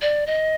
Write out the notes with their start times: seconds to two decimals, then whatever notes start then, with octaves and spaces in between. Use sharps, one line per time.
0.02 D5
0.27 D#5